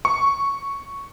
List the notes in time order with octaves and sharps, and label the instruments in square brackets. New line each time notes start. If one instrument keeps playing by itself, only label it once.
[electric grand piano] C#6